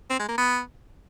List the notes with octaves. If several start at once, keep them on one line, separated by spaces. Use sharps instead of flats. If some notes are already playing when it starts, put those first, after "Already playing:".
C4
G#3
A#3
B3